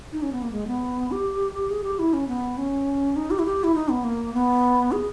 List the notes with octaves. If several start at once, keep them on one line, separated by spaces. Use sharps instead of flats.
D#4
C#4
B3
A#3
G#3
B3
G4
G#4
G4
E4
C#4
B3
C#4
D#4
G4
E4
G4
E4
D#4
B3
A#3
B3
G#4